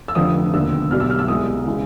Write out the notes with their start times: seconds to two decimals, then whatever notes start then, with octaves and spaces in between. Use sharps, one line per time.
0.08 E6
0.15 F1 F2 D3 F3 D#6
0.53 E1 D#2 D3 E6
0.91 B1 B2 G3 F6
1.00 E6
1.10 F6
1.19 E6
1.28 C2 B2 G#3 D#6
1.66 C#3 E3 G#3